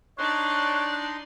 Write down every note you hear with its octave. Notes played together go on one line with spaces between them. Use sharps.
D4 D#4 C#5 D5 C6 F#6